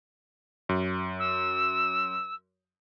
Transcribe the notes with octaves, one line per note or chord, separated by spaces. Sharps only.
F#2
E6